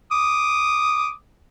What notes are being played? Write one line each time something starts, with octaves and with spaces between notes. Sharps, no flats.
D6 D#6